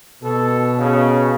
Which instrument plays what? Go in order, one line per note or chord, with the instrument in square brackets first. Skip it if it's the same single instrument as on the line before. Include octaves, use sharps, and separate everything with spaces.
[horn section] B2 [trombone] A4
[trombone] C#3